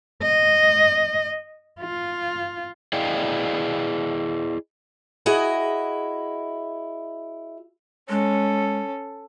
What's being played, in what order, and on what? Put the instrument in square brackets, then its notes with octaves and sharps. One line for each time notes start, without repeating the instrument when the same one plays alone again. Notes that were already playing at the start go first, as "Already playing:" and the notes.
[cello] D#5
F4
[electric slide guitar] E4 G#4 D5 D#5 F5 G5
[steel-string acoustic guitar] E4 F#4 G#4 D#5
[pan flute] G#3 [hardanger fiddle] C#4 A4